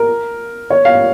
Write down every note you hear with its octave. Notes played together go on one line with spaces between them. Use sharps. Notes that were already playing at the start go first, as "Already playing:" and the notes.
Already playing: A#4
C#5
F5